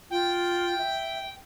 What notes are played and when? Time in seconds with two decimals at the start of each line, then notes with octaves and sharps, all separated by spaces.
0.11 F4 G5
0.78 E5